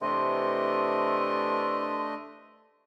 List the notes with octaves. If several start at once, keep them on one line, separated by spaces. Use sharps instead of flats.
C3 E3 A3 D4 D#5 C6